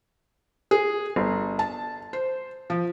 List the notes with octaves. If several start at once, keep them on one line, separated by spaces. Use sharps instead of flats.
G#4
G1
A5
C5
F3